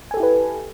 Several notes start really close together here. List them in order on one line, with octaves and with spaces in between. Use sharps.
G#5 A4 G4 E4 B4